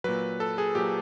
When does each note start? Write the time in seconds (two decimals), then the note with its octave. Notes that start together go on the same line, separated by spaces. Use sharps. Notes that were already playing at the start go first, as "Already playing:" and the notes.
0.04 A#2 F#3 B4
0.40 A4
0.58 G#4
0.75 A#2 F#3 G4